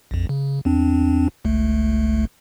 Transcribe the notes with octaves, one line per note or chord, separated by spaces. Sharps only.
A#1 F2
C#3
E2 C4 D4
G1 C#2 A3